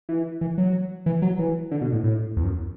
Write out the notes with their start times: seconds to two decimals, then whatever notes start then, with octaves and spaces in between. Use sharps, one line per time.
0.09 E3
0.41 E3
0.58 F#3
1.06 E3
1.22 F#3
1.39 E3
1.71 D3
1.81 B2
1.92 A2
2.04 A2
2.37 E2
2.44 F#2